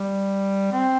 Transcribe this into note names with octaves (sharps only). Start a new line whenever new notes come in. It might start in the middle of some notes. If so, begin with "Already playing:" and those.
Already playing: G3
C4